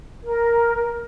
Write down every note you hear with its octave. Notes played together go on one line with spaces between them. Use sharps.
A#4